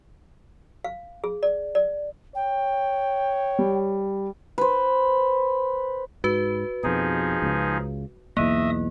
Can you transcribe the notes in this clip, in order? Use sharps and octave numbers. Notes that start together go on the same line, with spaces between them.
F5
G#4
D5
D5
C#5 G5
G3
B4 C5
G#2 F#4 B4
F2 B2 F3 D#4 G#4
C#2 C#3
B1 E2 A#3 D#5 E5 D#6